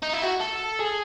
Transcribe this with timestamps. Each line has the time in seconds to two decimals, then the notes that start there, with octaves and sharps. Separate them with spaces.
0.03 D#4
0.13 E4
0.23 F#4
0.41 A4
0.80 G#4